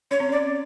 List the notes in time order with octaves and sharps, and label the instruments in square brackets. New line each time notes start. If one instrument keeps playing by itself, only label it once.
[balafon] C#4 [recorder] C#5
[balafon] C4
[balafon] C#4 [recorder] D5